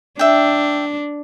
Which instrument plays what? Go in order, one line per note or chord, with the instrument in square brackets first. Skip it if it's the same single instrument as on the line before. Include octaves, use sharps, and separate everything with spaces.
[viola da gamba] D4 [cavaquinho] E5 G5